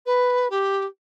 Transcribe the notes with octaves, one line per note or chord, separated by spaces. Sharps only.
B4
G4